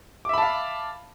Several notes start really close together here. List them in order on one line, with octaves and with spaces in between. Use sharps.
D6 E5 B5 A5 F5